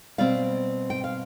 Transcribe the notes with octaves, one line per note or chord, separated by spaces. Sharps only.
B2 G3 C4 D5 F5
G5
F5